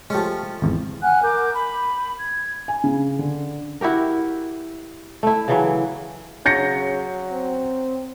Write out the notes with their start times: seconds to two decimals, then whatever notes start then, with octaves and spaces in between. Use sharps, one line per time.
0.10 F3 G#3 A3 C#4 G4
0.62 G#1 E2
1.02 F#5 G#5 F6 F#6
1.23 A#4 D6 G6
1.55 B5
2.18 G#6
2.68 G#5
2.84 C#3
3.19 D3
3.81 E4 F#4 G4 A#4
5.23 A3 E4
5.48 C#3 E3 F#3
6.46 C#3 F#3 G6 A#6 C#7
7.32 C4